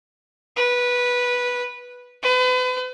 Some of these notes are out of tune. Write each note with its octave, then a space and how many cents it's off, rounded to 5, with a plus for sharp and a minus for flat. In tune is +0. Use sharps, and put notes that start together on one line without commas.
B4 -10
B4 +40